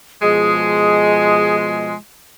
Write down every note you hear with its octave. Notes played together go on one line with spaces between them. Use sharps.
B2 F3 G#3 G#4